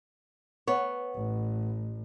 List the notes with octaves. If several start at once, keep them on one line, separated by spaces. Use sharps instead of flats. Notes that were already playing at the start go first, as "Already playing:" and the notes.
B3 C#5
A1